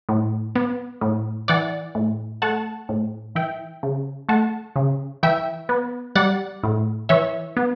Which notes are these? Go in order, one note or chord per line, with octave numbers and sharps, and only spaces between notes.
A2
B3
A2
E3 D5 F#5
A2
A3 F#5 A5
A2
E3 E5 G5
C#3
A3 F#5 A5
C#3
E3 E5 G5
B3
G3 D5 F#5
A2
E3 C#5 E5
B3